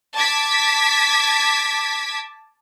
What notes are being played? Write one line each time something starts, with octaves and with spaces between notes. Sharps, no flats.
A5 D6 G#6 B6